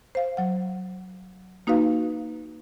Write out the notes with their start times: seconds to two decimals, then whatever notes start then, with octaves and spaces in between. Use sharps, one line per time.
0.15 C5 F5
0.37 F#3 F#5
1.67 A#3 D#4 F#4 B4 F5